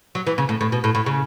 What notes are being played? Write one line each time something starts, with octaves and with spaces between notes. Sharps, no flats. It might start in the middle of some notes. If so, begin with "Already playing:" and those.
F#3
E3
C#3
A2
A2
B2
A2
A2
C#3